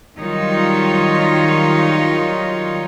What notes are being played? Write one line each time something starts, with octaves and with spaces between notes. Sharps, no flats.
D#3 F#3 G3 D#4 F4 C#5